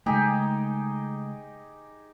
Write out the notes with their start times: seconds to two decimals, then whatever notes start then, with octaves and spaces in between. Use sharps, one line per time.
0.06 C#3 G#3 A3 D#4 G4 G#4